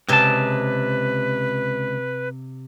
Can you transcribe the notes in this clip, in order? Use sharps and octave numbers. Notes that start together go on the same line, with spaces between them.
C#2 C3 G#4 B4 G5 A5